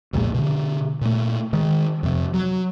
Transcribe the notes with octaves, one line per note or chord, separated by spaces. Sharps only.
B1 F2 A#2 G#3
B2 D3
A#2 A3
D#3 G#3
F2 C3
F#3